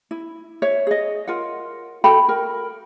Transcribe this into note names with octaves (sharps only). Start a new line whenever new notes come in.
E4
C#5 E5
G#4 D#5
F4 A#4 F#5
F#4 A4 G5 B5
A#4